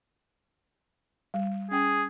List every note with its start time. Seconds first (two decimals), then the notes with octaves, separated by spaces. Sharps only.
1.34 G3
1.71 C#4 G#4 G5